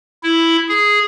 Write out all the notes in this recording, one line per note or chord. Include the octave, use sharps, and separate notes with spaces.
E4
G#4